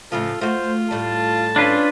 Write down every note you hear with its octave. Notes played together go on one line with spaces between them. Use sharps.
A2 C#3 F3 F4 A4
A3 F4 F#4 C5
A2 G3 A5
C#4 D4 F4 B4